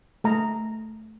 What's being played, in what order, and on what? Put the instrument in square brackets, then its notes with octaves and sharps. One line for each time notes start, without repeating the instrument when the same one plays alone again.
[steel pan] A3 A#5